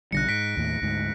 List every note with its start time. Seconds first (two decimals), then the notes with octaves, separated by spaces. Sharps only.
0.12 B1 D3 G3 F#6 A#6 C#7
0.29 G#2 B6 C#7 D7
0.57 D#2 A2
0.82 D2 G#2